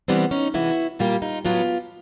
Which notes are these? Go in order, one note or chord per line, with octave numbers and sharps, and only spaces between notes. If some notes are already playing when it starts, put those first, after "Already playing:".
C3 E3 G3 B3 C4 D4
C#4 D#4
C3 E3 G#3 E4 F#4
A#2 G3 A#3 F4 G4
D#4 F4
A2 F#3 B3 F4 G4